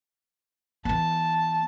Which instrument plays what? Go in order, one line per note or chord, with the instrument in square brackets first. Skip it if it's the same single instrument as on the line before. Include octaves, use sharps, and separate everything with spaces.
[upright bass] E3 B3 [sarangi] A5